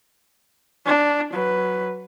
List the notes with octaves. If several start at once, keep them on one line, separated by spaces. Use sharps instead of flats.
D4
F#3 B4